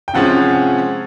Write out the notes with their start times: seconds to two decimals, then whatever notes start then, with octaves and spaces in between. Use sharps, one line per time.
0.08 G5
0.14 C3 F3 G#3 C#4 F#5